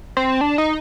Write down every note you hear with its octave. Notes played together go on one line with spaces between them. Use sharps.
C4
D4
D#4